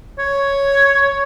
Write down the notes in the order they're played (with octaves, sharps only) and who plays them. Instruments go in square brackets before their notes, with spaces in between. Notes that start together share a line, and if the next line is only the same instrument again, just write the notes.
[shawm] C#5